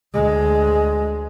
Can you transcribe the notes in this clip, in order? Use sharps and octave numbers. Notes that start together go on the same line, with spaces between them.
D2 G#3